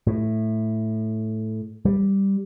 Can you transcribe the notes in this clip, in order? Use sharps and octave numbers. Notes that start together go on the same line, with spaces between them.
A2
G3